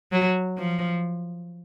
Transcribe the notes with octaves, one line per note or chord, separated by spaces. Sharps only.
F#3
F3